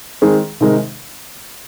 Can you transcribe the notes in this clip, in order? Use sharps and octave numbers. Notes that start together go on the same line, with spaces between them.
D#3 G#3 C4 G#4
C3 D#3 G#3 D#4 A#4